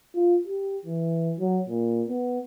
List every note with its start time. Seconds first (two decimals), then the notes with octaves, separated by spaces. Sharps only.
0.15 F4
0.47 G4
0.86 E3
1.40 F#3
1.69 A#2
2.08 B3